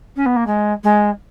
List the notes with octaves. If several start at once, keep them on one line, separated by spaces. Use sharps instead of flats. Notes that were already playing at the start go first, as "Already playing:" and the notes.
C#4
B3
A#3
G#3
G#3